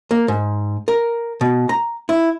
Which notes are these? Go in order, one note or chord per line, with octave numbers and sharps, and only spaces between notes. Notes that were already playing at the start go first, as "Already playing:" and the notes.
A#3
G#2
A#4
B2
A#5
E4